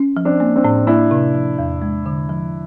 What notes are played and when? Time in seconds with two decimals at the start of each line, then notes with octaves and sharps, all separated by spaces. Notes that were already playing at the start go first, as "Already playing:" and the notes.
Already playing: C#4
0.17 F3
0.25 C4 D4
0.40 A#3
0.56 C4 D4
0.64 A2
0.87 A#3 D4 E4
1.11 C3
1.34 F3
1.58 E2
1.82 G#3
2.06 D3
2.29 F3